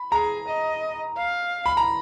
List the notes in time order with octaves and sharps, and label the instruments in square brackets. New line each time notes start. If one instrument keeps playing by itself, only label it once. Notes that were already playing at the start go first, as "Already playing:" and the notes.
Already playing: [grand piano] B5
[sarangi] G#4 [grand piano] A#5
[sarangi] D#5
F5
[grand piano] B5
A#5